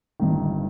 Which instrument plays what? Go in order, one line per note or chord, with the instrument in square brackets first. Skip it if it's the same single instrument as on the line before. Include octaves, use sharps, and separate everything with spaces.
[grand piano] G1 G2 D#3